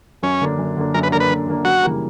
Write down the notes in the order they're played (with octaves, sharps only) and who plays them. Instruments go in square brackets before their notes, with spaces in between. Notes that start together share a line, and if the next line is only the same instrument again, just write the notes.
[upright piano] F#2 [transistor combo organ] C#4
[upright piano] D3 A#3 D4
F#2
D3 A#3 D4
[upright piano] F#2 [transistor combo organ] A#4
[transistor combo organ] B4
[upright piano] D3 A#3 D4 [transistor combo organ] A#4
[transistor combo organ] B4
[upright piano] F#2
D3 A#3 D4
[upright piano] F#2 [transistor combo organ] F#4
[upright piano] C#3 E3 G3 A#3